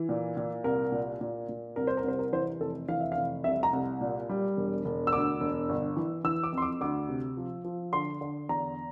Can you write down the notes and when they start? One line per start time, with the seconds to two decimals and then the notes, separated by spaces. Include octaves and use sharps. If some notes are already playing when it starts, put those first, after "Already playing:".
Already playing: E3
0.09 A#2
0.37 A#2
0.64 C2 A#4
0.92 A#2
1.21 A#2
1.49 A#2
1.76 C2 A#4
1.87 C5
1.97 A#4
2.04 C2 C5
2.19 A#4
2.33 E3 C5
2.60 F1 A4
2.88 E3 F5
3.00 E5
3.12 F5
3.17 F1
3.44 C2 E5
3.63 A#5
3.73 C2
4.01 A#2
4.29 G3
4.57 E1
4.85 E1
5.07 E6
5.13 D2 D6
5.41 E1
5.69 G1
5.96 E3
6.24 E3 E6
6.43 D6
6.53 F2
6.58 C6
6.62 D6
6.81 D2 D6
7.09 C3
7.37 F3
7.64 F3
7.93 D3 C6
8.21 D3
8.49 E2 A#5